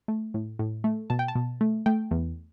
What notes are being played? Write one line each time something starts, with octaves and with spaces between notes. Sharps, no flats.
A3
A2
A2
A3
B2 A5
G5
A5
B2
A3
A3 G5
E2